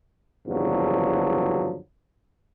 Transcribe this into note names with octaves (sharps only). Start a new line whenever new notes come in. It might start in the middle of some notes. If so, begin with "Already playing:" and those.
F#1 E2 G2 D3 F3 F#3